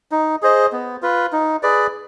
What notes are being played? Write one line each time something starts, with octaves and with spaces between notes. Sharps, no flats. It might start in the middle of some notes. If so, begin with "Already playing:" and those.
D#4
G#4 C5 D#5
B3
F4 B4
D#4
G#4 B4 D5